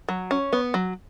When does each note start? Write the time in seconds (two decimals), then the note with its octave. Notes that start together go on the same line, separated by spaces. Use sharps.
0.09 F#3
0.31 C#4
0.53 B3
0.74 F#3